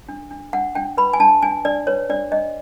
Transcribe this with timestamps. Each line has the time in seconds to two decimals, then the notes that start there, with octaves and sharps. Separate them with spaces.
0.08 D4
0.31 D4
0.53 D4 F#5
0.75 D4 G5
0.97 B4 B5
1.13 G#5
1.20 D4 A5
1.42 D4 G#5
1.65 D4 D5
1.87 B4 C#5
2.10 D4 D5
2.31 D4 D#5